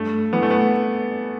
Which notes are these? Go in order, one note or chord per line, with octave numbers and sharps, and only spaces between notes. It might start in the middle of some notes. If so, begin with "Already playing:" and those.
Already playing: G2 A3
E3 B3
A3
B3